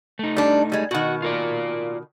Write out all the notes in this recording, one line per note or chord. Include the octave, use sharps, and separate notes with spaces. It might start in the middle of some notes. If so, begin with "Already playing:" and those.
A3 D#4
G3 D4
G3 G#3
B2 D#3 F#4 F#5
F4 A#4 D5